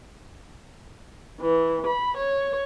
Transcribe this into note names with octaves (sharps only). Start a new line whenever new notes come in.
E3
B5
C#5